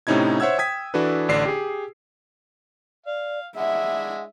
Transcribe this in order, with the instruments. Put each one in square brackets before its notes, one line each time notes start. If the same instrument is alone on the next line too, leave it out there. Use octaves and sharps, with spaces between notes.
[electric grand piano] A2 C3 C#4 D#4 E4 G#6
C5 C#5 E5 F#5 E6 G#6
G5 D#6 G#6 B6
E3 D4 F#4 A4 B4
A1 D3 D4 C7
G4 G#4
[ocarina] D5 [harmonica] F5
[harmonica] G#3 D4 E4 [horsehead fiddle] E5 [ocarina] F#5